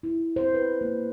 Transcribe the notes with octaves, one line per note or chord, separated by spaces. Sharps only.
E4
C5
B4
A#3